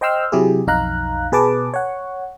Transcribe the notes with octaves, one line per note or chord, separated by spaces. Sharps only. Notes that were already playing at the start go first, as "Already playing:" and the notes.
C5 D#5 G5 C6 E6 F6
C3 F#3 E4 G4 G#4
B1 F2 D#4 F5 A#5 F#6
B2 G#4 B4 A5 D6
C#5 F#5